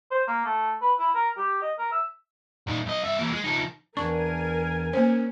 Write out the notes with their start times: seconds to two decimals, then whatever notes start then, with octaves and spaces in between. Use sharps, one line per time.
0.11 C5
0.27 A#3
0.45 A3
0.81 B4
0.98 E4
1.15 A#4
1.37 G4
1.62 D#5
1.78 A#4
1.92 E5
2.67 A#2 D#4
2.86 B1 D#5
3.04 G2 E5
3.19 E3 A#3
3.33 G#3
3.45 F3 D#4
3.97 E2 G2 D4 A#4 G#5 C#6
4.93 A#3 C#4 C5